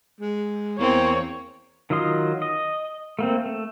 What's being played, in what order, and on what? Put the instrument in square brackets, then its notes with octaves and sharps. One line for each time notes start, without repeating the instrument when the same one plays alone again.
[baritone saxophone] G#3
[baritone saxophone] E2 [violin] A#3 C4 [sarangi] C#5
[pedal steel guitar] D#3 F#3 F4 D#5 C6
D#5
A3 A#3 C4
A3